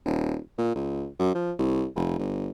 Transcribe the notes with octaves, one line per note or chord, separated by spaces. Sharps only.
D#1
A#2
C#2
F#2
F3
C2
F1
G1